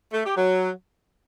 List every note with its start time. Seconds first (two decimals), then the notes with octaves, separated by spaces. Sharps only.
0.13 A3
0.25 G4
0.37 F#3